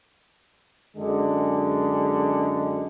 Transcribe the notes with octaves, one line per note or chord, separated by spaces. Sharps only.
F#2 D3 G#3